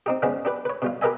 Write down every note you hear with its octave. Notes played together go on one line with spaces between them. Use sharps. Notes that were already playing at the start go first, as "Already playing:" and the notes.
C4 D#4 G4
F3 G#3 B3 C#4 D4
D4 G4 B4
B4 C#5
B2 G3 F4
G4 A#4 B4 D#5 E5 G#5